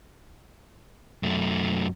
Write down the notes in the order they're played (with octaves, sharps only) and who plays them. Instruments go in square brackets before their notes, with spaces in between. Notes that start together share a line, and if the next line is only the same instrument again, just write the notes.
[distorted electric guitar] F#2 A3